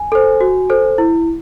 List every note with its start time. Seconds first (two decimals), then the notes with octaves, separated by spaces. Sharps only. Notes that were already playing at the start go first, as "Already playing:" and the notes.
Already playing: G#5
0.12 A4 C5
0.41 F#4
0.70 A4 C5
0.98 E4